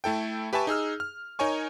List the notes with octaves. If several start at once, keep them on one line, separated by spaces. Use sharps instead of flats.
A3 E4 A4 G5
G4 B4 E5 G#5 A5 C#6
D#4 G#4 E6 F6
F6
D#4 A#4 C#5 G#5 C#6